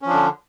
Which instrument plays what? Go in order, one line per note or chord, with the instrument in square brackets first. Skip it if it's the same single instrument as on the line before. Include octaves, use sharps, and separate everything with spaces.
[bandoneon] C#4
F3
D4
D3